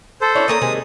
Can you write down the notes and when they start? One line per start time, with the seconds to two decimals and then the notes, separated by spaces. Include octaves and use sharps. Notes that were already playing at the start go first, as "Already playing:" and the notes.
0.21 A4 C5
0.35 C#4 D4 E4
0.48 A3 A#3 A#5 D#6
0.61 C3 D#3 G#3